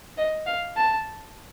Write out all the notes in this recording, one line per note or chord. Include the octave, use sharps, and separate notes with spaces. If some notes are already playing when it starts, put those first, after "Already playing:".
D#5
F5
A5